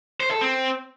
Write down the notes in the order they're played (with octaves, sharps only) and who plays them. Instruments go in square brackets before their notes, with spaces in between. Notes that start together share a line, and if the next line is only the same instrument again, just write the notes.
[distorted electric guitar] C5
A4
C4